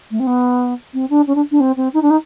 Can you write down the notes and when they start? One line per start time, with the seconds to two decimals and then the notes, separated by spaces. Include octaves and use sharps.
0.11 A3
0.20 C4
0.27 B3
0.94 C4
1.10 D4
1.27 C#4
1.35 D4
1.51 D4
1.60 C4
1.77 C4
1.94 D#4
2.02 D4
2.10 D#4